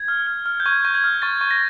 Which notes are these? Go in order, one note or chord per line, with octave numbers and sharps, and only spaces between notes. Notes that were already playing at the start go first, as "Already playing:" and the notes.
Already playing: G#6
F6
F6
F6
G6
C#6 G#6
C#6 G6
G#6
F6
C#6 A6
C#6
A#6